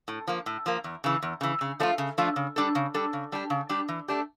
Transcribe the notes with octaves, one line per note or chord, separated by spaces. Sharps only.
A2
F3 A#3
A2
F3 A#3
E2
C#3 E3
E2
C#3 E3
C#3
F3 A3 D4 F4
C#3
F3 A3 D4 F4
C#3
G3 D4 A4
C#3
G3 D4 A4
C#3
G3 D4 G4
C#3
G3 D4 G4
E3
A3 D4 G4